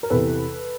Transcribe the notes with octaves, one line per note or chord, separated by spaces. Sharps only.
A#4
E2 C3 E3 A4 B4